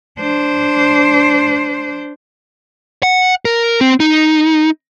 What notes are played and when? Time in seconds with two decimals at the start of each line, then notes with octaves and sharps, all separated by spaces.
0.19 D4 C5
3.03 F#5
3.45 A#4
3.81 C4
4.00 D#4